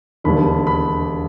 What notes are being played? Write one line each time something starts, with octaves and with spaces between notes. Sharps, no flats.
E1 D#2 D3 G3 B5
B5